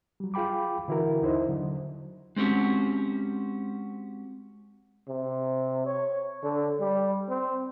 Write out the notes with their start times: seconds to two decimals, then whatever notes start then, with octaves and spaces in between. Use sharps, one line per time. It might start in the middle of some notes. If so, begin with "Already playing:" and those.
0.20 F#3 G3
0.34 F4 G#4 G5 B5 D6
0.88 D3 E3 E4 F#4 A#4
1.22 D#2 D#4 E4 C5 D#5
1.48 D3 F#3
2.36 G#3 C4 C#4 F#4 G4
5.08 C3
5.86 C#5
6.43 D3
6.80 G3
7.29 C4